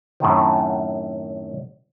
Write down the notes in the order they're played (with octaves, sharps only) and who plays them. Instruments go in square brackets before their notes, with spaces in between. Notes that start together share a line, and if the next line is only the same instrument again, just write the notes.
[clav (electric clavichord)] F#2 A2 C3 D#3